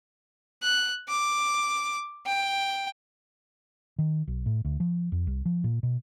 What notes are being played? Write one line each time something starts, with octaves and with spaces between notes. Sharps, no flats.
F#6
D6
G5
D#3
B1
A2
D2
F3
F2
C2
F3
A#2
B2